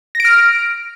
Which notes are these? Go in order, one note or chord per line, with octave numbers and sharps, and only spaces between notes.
F6 A#6 D7